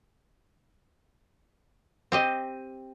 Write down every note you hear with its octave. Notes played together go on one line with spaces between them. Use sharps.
C4 G4 D#5